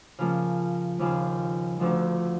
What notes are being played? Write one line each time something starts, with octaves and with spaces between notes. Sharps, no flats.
C#3 F3 A#3
D#2 C#3 F3
D2 D3 F3